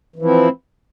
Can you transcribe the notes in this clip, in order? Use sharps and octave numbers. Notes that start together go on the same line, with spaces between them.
E3 F3 C4 E4